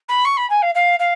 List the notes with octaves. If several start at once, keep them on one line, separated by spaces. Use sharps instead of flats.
B5
C#6
B5
G#5
F5
F5
F5